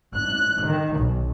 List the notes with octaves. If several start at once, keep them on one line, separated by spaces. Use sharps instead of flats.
F#6
D#3
B1